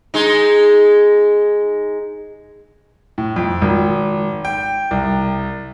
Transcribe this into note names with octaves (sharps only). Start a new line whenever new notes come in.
G#3 D#4
A2
F2
G#1
G5
C2